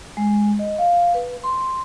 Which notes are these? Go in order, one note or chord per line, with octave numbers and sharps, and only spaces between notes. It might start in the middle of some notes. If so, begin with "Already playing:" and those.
G#3
D#5
F5
B4
C6